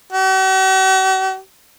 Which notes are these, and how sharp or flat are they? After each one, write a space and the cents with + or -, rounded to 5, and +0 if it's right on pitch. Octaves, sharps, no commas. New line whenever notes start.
F#4 +45